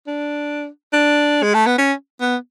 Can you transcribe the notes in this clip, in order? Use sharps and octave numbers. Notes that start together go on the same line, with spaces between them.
D4
D4
G#3
A3
B3
C#4
B3